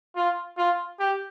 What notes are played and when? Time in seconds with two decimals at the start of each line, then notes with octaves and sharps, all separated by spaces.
0.15 F4
0.57 F4
0.99 G4